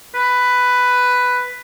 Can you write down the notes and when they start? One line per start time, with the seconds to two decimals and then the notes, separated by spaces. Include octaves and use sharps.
0.15 B4